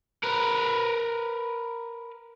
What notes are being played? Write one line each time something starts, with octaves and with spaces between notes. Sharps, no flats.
A#4 B4